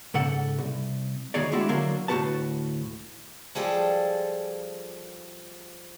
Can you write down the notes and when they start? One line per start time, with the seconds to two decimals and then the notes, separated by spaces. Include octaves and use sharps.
0.14 G#2 C#3 A4 F#5
0.58 C2
1.34 D2 D#3 F#4 G#4 C#5 D5
1.52 G#3 A3 D4 E4 F#4 G4
1.69 D3 F#3 A#3 D4
2.08 D2 A2 D4 F#4 B4 A5
3.55 F3 G3 G#4 A4 G5